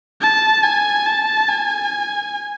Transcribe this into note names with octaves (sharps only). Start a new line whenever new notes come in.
A5
G#5
A5
G#5